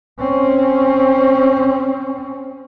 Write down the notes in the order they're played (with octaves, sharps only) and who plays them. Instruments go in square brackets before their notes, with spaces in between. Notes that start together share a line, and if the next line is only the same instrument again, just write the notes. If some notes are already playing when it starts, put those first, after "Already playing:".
[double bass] C4 C#4